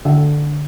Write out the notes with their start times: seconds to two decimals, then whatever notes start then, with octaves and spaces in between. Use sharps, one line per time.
0.05 D3